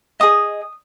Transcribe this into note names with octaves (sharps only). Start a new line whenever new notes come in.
G#4 D#5 D#6